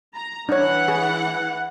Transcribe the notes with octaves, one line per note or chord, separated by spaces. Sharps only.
A#5
E3 D4 C#5 F#5
G#4